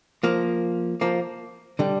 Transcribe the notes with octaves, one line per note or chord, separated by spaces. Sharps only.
F3 A#3
F3 A#3
D3 G3